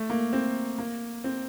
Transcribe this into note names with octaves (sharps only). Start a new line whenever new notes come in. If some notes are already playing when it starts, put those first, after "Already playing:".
Already playing: A3
A#3
C4
A#3
C4